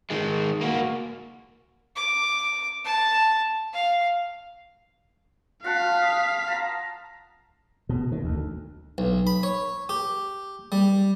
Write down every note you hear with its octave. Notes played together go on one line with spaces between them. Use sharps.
D#3 G#3
A#3 F#4
D6
A5
F5
F4 F5 F#5 A5 B6
D#6
A5 A#5
B2
D#3
D2
B1
B5
C#5
G4
G3